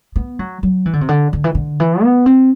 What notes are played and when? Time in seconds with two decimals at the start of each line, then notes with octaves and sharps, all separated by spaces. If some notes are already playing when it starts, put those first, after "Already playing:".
0.16 B3
0.39 F#3
0.63 F#3
0.86 E3
0.93 D3
1.01 C3
1.09 D3
1.33 D3
1.44 E3
1.55 D3
1.80 E3
2.03 B3
2.26 C4